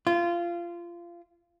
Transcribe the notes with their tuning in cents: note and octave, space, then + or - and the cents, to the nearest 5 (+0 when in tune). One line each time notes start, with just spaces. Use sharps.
F4 -20